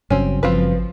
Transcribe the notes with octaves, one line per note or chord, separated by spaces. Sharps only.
G1 G2 C#3 F#3 C4 C#4
G#1 F3 C4 F4 B4